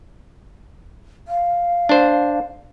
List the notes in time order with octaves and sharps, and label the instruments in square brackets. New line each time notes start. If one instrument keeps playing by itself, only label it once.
[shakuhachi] F5
[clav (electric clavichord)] D4 C5